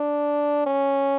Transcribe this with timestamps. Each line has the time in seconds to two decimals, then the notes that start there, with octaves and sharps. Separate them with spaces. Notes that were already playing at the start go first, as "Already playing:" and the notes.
Already playing: D4
0.66 C#4